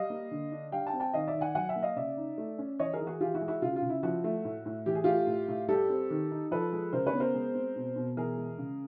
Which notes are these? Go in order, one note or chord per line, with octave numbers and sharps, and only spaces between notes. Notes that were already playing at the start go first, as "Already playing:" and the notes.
Already playing: G3 D#5 F5
A#3
D3
D4
G3 F5 G5
G5 A5
C4
G5 A5
D#3 D#5 F5
D5 E5
D#3
F#5 G#5
F#3 F#5 G#5
E5 F#5
A#3
D#5 F5
C#3 D5 E5
D#4
A3
C#4
E3 C#5 D#5
G#4 A#4
E3
F#4 G#4
E3 F4 G4
E4 F#4
G#3
E4 F#4
C#3 F4
F4
C#3
E4
F3 E4 F#4
A3
A2
A2
E3 G4
G#4
A3 F4 G4
A2
A2
G3 G4 A4
C4
D#3
D#4
F3 A4 B4
G#3
C#3 A#4 C5
B4 C#5
B3
A#4 C5
G#3
C4
B2
B2
E3 G#4 A#4
G#3
C#3